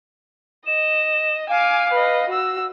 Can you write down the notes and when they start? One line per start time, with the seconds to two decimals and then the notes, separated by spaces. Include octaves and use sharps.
0.67 D#5 E7
1.49 F5 G#5 D6
1.92 B4 D#5
2.29 F#4 E6